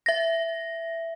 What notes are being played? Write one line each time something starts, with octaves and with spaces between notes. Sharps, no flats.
E5 A#6